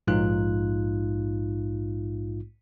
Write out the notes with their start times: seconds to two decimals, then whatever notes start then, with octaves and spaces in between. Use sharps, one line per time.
0.07 A#1 G#2 D#4 F4 F#6